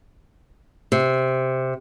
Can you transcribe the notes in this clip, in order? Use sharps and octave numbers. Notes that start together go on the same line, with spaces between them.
C3